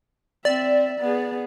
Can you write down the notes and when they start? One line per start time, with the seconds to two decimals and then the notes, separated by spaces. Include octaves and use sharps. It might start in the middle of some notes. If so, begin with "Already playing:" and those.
0.45 C4 D5 E5
1.00 B3 G#4